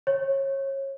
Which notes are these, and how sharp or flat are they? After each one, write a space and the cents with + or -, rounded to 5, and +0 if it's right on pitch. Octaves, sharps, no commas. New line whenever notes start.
C#5 -25